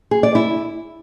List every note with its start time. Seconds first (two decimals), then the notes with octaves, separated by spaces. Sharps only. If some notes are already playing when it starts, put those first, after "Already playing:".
0.11 G#4
0.23 D5
0.35 E4